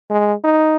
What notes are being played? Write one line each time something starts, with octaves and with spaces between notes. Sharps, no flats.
G#3
D#4